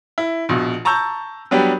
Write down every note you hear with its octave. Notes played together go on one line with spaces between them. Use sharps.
E4
A#1 B2
A5 A#5 C#6 E6 G6
F#3 G3 B3 D4 G4